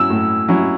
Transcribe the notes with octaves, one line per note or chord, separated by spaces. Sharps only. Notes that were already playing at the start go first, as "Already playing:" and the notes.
Already playing: F#3 C#4 E4 E6
A2
F#3 C#4 E4